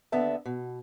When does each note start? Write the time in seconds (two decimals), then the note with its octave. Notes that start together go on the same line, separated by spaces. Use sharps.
0.12 D#2 D3 B3 E5 A5
0.45 B2